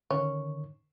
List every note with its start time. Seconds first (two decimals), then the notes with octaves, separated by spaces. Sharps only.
0.11 D3 D#3 C#4